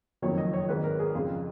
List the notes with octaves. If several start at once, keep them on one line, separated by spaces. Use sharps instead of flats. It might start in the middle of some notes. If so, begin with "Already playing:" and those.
F#1 F2 D#3 F#3 C#5
D#5
C#5
G#1 G#2 D#3 B4
A#4
G#4
F2 C#3 G#3 F4